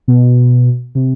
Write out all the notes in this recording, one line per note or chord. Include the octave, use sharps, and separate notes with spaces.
B2
C3